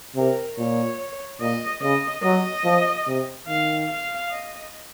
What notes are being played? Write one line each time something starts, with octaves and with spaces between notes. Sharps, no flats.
C3 A#4
A#2 C#5
A#2 D#5
C#3 D#5
F#3 D#5
F3
C3
D#3 F5
F5
D#5